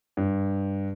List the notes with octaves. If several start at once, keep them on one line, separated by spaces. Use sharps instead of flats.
G2